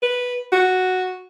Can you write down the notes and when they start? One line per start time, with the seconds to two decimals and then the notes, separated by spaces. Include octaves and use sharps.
0.02 B4
0.53 F#4